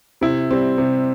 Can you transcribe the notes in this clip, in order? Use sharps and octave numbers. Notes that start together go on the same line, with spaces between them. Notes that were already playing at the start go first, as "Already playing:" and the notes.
C3 E4
G3 C4
C3